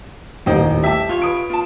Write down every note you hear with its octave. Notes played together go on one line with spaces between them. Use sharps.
D#1 A1 D#2 D#4 C5 G5
G4 E5 G5 A5
F4 C#5
B4 D#6 D7
F4 A5